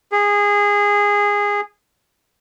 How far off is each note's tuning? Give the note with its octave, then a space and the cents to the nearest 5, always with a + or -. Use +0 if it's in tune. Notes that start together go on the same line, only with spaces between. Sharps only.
G#4 -20